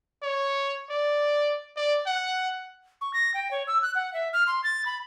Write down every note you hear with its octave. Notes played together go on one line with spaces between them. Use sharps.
C#5
D5
D5
F#5
C#6
A#6
G5
C#5
E6
F#6
F#5
E5
F6
C6
A6
B5